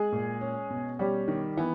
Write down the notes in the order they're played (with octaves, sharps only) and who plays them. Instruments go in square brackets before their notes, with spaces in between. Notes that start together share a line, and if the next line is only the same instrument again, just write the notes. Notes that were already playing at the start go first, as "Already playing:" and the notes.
Already playing: [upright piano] G#3 G#4
[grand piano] A#2
C#4
B2
[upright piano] G3 G4 [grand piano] C#4
[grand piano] D#3
[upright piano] E3 E4 [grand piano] B3